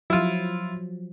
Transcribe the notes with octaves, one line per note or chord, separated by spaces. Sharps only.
F3 F#3 E4 F4